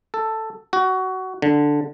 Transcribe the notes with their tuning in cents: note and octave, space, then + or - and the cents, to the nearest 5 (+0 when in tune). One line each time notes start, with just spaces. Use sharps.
A4 +5
F#4 +20
D3 +0